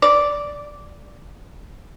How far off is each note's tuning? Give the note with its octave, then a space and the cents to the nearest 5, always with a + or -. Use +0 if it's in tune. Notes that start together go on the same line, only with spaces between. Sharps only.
D5 -5